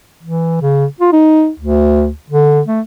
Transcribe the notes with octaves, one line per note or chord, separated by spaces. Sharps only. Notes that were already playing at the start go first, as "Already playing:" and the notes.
E3
C#3
F4
D#4
D2
D3
A3